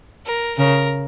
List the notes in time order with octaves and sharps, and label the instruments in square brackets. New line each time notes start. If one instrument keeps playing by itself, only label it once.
[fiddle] A#4
[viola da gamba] C#3 [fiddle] A#4